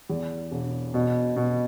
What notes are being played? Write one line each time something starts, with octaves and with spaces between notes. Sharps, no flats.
E2
E1
B2
B2